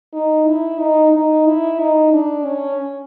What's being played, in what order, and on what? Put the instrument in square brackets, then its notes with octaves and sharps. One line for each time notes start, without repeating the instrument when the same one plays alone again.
[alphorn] D#4
E4
D#4
D#4
E4
D#4
D4
C#4